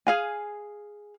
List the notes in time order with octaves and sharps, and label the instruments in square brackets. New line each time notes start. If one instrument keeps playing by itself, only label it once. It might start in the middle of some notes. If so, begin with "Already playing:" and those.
[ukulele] G#4 F5 G#5